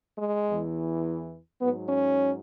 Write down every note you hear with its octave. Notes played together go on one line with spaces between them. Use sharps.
G#3
E2 E3
G#2 F#3 B3
C#4